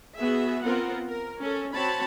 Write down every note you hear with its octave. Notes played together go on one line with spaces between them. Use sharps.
B3 F#4 G#4 E5
B3 C4 F4 A#4 F#5
A#4
C#4 A4
C4 F#4 C#5 A5 B5